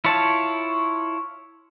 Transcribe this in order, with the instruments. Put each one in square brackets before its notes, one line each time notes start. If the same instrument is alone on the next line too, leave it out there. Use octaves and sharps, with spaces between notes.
[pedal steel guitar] E4 F4 C#5 A5